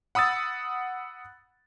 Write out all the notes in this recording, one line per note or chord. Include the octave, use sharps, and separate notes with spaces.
F#5 B5 D#6 E6 A6